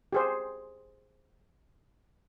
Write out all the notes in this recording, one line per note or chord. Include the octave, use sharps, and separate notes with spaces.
G4 G#4 C5